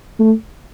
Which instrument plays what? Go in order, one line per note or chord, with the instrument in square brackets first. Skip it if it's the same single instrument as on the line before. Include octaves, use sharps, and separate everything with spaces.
[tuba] A3